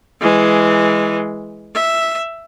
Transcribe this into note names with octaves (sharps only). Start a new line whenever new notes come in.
E3 G#3
E5